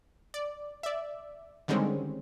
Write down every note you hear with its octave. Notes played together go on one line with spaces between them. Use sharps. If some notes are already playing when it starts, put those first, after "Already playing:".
D5
D5 E5
D3 D#3 G3 G#3 C4 C#4